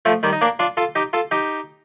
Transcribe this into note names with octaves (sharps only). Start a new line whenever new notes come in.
F3 A3
D#3 G3
D#4
A#3 D4
D4 F4
F4 A4
D#4 G4
F4 A4
D#4 G4